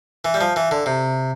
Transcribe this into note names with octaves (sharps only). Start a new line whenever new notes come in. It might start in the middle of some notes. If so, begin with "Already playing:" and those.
E3
G3
F3
E3
D3
C3